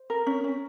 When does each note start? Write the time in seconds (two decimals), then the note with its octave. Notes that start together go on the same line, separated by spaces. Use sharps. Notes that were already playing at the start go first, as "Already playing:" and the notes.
Already playing: C5
0.10 A#4
0.27 C#4
0.44 C#4